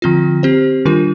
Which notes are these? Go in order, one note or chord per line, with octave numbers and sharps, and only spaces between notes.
D3 F3 C4 F4
C4 G4 C5
D#3 G3 D4 F4 A#4